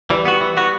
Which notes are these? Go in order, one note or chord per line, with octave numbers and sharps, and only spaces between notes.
E3 G3
B3 F#4
E3
B3 F#4